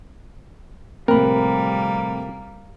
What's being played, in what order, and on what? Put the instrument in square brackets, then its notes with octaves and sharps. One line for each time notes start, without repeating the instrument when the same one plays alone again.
[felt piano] A#1 A2 C3 [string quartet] G3 A#3 [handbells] C4 B5 [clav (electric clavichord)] A#4